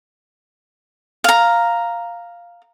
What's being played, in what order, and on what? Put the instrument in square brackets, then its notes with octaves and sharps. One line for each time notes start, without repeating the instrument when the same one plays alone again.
[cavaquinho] F5 A#5